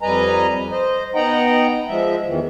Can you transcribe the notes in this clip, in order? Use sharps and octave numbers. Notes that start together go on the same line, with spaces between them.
F2 G3 B4 D#5 G#5 A#5
C5 D#5
B3 D#4 D#5 F#5 G5 A#5
F3 G#3 E5
E2 D#3 E3